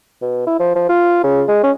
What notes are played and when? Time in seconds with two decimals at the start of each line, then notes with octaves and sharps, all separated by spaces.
0.22 B2
0.47 E4
0.59 F3
0.75 F3
0.89 F4
1.24 C#3
1.48 G#3
1.63 C#4